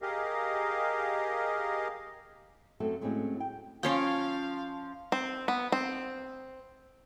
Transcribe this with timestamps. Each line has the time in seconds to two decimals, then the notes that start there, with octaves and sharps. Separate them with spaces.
0.02 G4 G#4 A#4 D#5 F5
2.80 F#2 F#3 A3 C4 A4
3.01 A2 F#3 G#3 A#3 C4 C#4
3.40 G5
3.83 F3 C#4 C#5 F5 G5 C6
5.12 C4
5.48 B3
5.72 C4